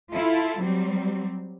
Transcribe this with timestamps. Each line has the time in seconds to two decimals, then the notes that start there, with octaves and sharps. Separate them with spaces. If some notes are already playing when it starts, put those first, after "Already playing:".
0.14 E4 F4 A4
0.62 F#3 G3 C4